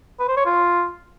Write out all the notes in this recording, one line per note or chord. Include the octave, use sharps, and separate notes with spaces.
B4
C5
C#5
F4